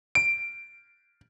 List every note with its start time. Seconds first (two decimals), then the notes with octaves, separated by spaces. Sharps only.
0.15 D7